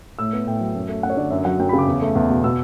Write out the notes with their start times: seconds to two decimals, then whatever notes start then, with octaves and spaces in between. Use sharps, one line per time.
0.19 A2 E6
0.33 B3
0.47 A2 G5
0.61 F#3
0.76 F#2
0.88 A3
1.03 F#2 F#5
1.10 C#5
1.17 D3 D5
1.31 F#2 E5
1.45 F#3 F#5
1.59 F#2 G5
1.69 B5
1.73 C#3
1.78 D6
1.87 E2
2.02 A3
2.15 E2
2.30 B2
2.44 B2 E6